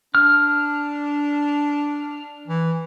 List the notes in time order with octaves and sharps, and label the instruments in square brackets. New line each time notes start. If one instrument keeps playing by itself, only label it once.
[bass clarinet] D4 [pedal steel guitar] F6
[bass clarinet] E3